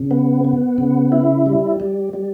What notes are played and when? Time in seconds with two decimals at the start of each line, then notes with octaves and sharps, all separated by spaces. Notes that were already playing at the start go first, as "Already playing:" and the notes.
Already playing: C#3
0.11 B3
0.44 B3
0.78 C#3
1.12 E4
1.46 G3
1.80 G3
2.13 G3